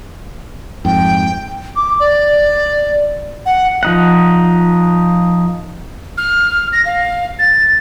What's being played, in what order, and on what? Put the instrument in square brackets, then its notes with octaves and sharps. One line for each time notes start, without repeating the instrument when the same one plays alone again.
[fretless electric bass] F2 G#2 [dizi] G5
[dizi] D6
D5
F#5
[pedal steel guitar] F3 D#4 F#5
[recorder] F6
A#6
F5
A6